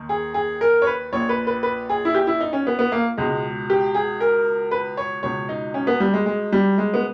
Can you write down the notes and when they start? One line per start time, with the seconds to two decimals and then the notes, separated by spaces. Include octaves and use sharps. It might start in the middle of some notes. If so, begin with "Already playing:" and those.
Already playing: D#2 D#3
0.09 G#4
0.34 G#4
0.61 A#4
0.82 C#5
0.87 B4
1.13 A#1 A#2 C#5
1.29 B4
1.47 B4
1.63 B4
1.90 G#4
2.05 E4
2.15 G4
2.27 E4
2.40 D#4
2.53 C#4
2.67 B3
2.79 B3
2.92 A#3
3.17 C#2 B2 G#3
3.70 G4
3.95 G#4
4.20 A#4
4.71 B4
4.97 C#5
5.23 C#2 B2 C#5
5.49 D#4
5.74 C#4
5.87 B3
6.00 G3
6.14 G#3
6.26 G#3
6.52 G3
6.78 G#3
6.94 B3